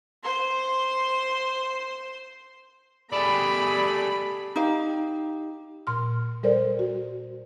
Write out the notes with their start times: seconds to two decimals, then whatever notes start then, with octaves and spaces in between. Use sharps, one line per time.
0.23 C5 C6
3.12 A3 G4 G#4 D5 B5
4.56 D#4 G4 F5
5.87 A#2 C6 F6
6.43 G3 A4 A#4 C5 D5
6.79 F#4